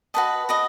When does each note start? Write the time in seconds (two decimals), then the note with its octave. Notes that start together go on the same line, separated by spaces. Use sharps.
0.14 F#4 B4 D#5 A5
0.49 F#4 B4 D#5